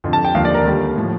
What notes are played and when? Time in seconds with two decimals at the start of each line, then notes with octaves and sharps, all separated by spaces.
0.04 F2 D3 F3
0.13 A5
0.25 G5
0.35 D#2 D3 F3 F5
0.45 D5
0.54 A#4
0.65 D#2 D3 G3
0.96 A2 F3